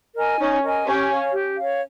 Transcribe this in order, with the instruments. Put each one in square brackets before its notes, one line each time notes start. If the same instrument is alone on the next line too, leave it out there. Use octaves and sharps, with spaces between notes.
[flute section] A#4 D#5 G#5
[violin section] C#4 [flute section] D#4
[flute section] A#4 D#5 G#5
[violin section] C#4 [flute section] G4
[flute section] C#5 F5
G4
C#5 F5